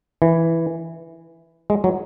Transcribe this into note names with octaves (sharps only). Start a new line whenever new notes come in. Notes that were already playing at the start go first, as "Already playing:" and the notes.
E3
G#3
F#3